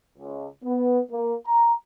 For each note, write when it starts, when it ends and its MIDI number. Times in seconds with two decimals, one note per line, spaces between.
0.18 0.47 37
0.64 1.00 59
1.11 1.35 58
1.47 1.73 82